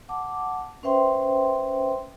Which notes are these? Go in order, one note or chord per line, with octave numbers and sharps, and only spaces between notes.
F#5 A5 D6
C#4 B4 C5 E5 G5 C6